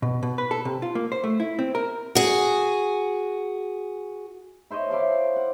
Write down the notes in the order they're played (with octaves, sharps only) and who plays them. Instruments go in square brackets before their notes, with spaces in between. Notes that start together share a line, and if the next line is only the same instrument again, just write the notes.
[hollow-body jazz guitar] B2
B2
B4
A4
C3
F4
A#3
C5
A3
E4
C4
A#4
[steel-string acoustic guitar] F#4 G#4
[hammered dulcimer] E4 C5 C#5 D#5
E4 D5 F5 A5
F#5